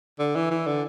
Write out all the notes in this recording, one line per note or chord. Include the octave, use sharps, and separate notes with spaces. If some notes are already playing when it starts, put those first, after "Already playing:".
D3
E3
E3
D3